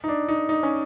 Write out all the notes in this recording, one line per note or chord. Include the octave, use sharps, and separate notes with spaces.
D#4
D4
D#4
D#4
C#4